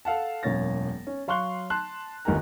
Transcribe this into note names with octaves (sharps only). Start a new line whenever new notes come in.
A4 F5 F#5 A5
E1 F#2 A#3 C#5 A6 A#6
C#4
F#3 F5 C6 C#6 F#6 G7
A5 C6 F#6
G1 D#3 G4 A#4 G#5 A#5